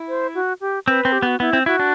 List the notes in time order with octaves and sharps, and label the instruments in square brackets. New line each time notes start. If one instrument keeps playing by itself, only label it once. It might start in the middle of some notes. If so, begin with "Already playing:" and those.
Already playing: [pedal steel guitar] E4
[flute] C5
F#4
G4
[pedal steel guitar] C4 [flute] B4
[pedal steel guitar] C4
[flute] G4
[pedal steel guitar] B3 [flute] F#4
[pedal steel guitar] B3 [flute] E4
[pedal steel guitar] C4
[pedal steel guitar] E4 [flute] F#4
[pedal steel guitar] D4